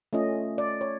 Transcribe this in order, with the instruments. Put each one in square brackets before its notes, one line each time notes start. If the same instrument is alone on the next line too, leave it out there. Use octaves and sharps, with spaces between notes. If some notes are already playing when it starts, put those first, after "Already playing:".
[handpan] A3 C#4 F4 D#5
D5
C#5